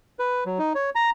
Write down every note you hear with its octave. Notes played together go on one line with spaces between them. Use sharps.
B4
F#3
D#4
C#5
A#5